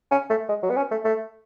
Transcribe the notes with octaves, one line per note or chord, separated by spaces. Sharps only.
C#4
A3
G#3
F#3
B3
C#4
A3
A3